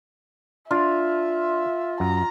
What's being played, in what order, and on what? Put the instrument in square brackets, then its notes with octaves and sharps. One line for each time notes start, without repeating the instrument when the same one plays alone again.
[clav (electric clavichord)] D4 [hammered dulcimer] F4 [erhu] E5
[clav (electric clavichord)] F#2 [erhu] A#5